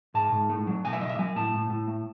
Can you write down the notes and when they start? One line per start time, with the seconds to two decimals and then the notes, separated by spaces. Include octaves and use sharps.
0.14 G#2 A5
0.32 G#2
0.49 A3
0.67 F#3
0.84 B1 G#5
0.93 E5
1.01 B1 D#5
1.09 E5
1.19 F#3 G#5
1.36 A2 A5
1.54 A2
1.70 A2
1.88 A3